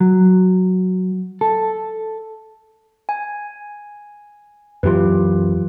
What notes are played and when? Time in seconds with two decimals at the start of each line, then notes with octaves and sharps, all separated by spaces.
0.01 F#3
1.41 A4
3.09 G#5
4.83 F#2 E3 F4 G4 B4